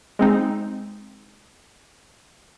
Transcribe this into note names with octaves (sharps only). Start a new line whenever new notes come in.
G#3 C4 D#4